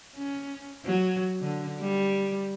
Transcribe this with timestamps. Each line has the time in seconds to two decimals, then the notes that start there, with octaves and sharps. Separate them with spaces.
0.17 C#4
0.85 F#3
1.42 D3
1.81 G3